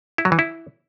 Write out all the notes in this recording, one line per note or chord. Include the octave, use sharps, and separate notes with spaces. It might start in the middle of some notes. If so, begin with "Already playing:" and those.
E4
F#3
E3
E4